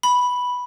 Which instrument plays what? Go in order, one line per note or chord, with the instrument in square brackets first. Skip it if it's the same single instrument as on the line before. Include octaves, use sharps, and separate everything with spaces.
[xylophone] B5